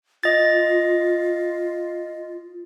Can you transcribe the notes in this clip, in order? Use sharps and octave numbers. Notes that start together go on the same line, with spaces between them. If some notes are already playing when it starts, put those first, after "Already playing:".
F4 D#5 A6